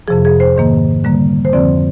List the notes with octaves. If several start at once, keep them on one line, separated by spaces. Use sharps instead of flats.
F2 C3 F3 G#4
G#4
C5
G#2 D#3 A#3
D3 G3 A#3
C5
F2 D3 F3 C4 D5